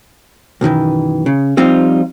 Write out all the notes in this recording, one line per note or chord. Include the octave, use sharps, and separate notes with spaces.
B1 F#2 D#3 E3
C#3
F3 G3 C4 D#4 F4